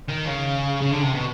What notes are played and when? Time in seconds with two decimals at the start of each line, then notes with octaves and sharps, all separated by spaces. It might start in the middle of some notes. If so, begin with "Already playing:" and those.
0.08 D#3
0.25 C#3
0.82 C#3
0.92 D3
1.03 C3
1.14 B2